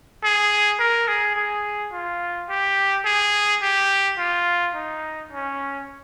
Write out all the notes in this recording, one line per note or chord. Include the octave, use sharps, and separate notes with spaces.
G#4
A#4
G#4
G#4
F4
G4
G#4
G4
F4
D#4
C#4